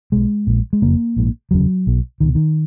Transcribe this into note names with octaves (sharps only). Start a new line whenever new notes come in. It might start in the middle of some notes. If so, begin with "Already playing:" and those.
B1 B2 G#3
A#1 A#2
G#3
F#1 F2 C#3 A#3
A#1 G#2
F1 D#2 C#3 F#3
B1 B2
C#2 B2 D#3
D#3